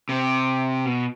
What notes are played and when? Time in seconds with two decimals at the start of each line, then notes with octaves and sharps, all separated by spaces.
0.09 C3
0.85 B2